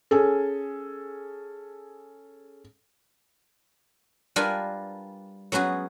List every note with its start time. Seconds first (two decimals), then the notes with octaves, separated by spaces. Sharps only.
0.11 C#4 G#4 A4
4.36 G3 D4 F4 A#4 B4 G#5
5.52 F#3 B3 C#4 F#4 G#4